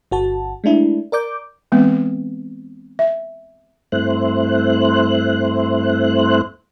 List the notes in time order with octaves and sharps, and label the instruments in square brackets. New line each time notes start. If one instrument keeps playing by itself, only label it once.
[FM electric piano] G1 F#4 A5
G#3 A3 D4 E4
A#4 D5 D6 G6
[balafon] E3 G#3 B3 C4
E5
[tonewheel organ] G2 A3 C4 E4 C5 F#6